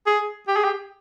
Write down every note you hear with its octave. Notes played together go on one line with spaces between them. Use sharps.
G#4
G4
G#4
G4